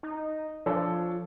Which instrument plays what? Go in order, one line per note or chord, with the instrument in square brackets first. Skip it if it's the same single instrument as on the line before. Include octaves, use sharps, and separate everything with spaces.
[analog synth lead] D#4
[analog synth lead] F3 [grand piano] D4 A4 C#5